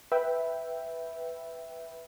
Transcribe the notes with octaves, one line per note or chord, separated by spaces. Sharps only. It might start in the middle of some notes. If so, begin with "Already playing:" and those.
B4 E5 G5